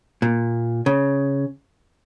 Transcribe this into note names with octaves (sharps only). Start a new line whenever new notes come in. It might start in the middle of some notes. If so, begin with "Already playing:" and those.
A#2
C#3